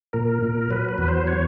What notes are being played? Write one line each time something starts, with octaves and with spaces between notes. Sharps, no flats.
A#2 A#4
A#2
F#3 B4
B4
E2
C5
C#5